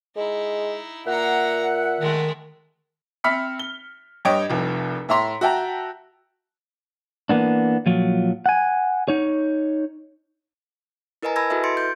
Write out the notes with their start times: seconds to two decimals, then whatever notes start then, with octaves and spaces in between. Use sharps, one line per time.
0.16 G#3 D#4 E4
1.06 A#2 A#3 E5 F#5 A#5
2.01 D#3 G#3 A3
3.24 C4 E5 B5 F6 B6 C#7
3.59 G7
4.25 G2 C#5 D#5 G5 D7
4.50 F1 C2 F2
5.09 A2 E5 A#5 C6 B6
5.41 F#4 E5 G5 A5 A#5
7.29 E3 A#3 B3 D4
7.86 A#2 F3 F#3
8.46 F#5 G#5
9.08 D#4 C#5
11.22 E4 A#4 B4 D#5 G#5 A#5
11.36 A5 B5 E6 G#6 A#6
11.50 E4 F#4 A4 B4 D#5 E5
11.64 C6 A6 C#7 D7
11.77 G6